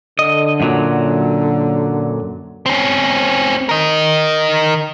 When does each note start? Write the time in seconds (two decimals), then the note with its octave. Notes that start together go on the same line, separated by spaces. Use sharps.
0.19 D3 D#5
0.60 F#2 A#2 F#3
2.66 C4 C#4
3.69 A#4 D#5